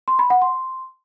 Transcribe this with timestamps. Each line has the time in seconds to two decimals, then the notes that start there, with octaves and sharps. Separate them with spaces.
0.08 C6
0.19 B5
0.30 F#5
0.42 C6